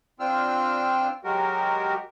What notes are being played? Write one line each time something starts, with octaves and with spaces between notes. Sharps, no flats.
C4 D4 F4 G5 E6 F6
F#3 G#3 F#4 G4 A#4